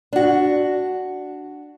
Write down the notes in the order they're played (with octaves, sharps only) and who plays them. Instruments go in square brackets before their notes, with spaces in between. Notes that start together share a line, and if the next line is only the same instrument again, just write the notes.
[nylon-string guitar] D4 F#4